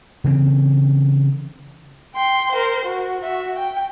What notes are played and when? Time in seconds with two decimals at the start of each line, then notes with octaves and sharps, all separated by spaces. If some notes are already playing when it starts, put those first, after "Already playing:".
0.24 C#3 E3 C4
2.14 G5 C6
2.52 A#4 C5
2.85 F#4
3.21 F#4 E5
3.56 G5